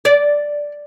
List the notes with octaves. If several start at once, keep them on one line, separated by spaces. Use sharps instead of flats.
D5